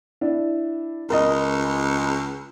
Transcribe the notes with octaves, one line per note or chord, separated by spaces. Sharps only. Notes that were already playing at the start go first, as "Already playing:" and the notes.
D4 E4
C#2 A#4 D#5